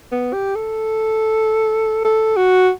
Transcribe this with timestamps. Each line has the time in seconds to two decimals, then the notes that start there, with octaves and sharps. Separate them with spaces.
0.12 B3
0.33 G4
0.55 A4
2.04 A4
2.37 F#4